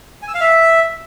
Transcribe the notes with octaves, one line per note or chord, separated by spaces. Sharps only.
G#5
E6
F5
E5